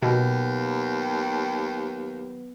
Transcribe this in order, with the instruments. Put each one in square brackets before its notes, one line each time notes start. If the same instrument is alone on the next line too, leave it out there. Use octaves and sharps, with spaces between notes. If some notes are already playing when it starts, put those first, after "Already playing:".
[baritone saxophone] D#2 [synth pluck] B2 [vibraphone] F#3 B3 B4